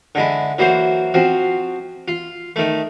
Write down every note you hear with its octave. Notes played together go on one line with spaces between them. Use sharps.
D3 G#3 E4
E3 F#3 A#3 C5
F3 C4 F#4
F4
D#3 A3